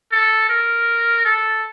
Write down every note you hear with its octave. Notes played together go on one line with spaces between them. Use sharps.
A4
A#4
A4